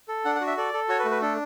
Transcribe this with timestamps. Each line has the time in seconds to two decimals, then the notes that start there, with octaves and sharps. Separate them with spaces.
0.08 A4
0.25 D4 F#5
0.35 F#5
0.41 F#4
0.47 E5
0.57 A4 D5
0.73 A4
0.89 F#4 C#5
0.99 B4
1.05 A3
1.11 B4
1.21 D4 A4